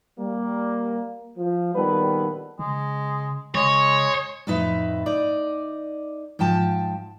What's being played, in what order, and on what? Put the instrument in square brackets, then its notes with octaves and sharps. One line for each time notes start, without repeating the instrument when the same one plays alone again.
[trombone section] G3 A#3
F3
A#1 D#3 G3 B3 A4 B4
[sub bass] C#3 [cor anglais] G#3
[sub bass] C#3 [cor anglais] G#3 [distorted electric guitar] C#5
[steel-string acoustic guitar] F2 A2 D#4 B4 E5
D#4 D5
G#2 F3 G5 A5